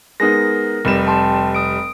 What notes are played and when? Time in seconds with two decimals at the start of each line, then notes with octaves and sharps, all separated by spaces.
0.20 G#3 B3 D#4 A#4 A#6
0.85 F1 G3 E7
1.07 G5 A5 C6
1.55 D#6 D7